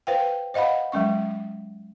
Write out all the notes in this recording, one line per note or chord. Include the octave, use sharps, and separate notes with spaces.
B4 C5 F5 G5
C5 D#5 F5 F#5 B5
F#3 G#3 C#4 C#6